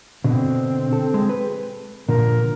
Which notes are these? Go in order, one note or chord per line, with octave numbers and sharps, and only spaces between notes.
B2 D3 C4
A4
G#3
B4
A#2 D3 F3 A#4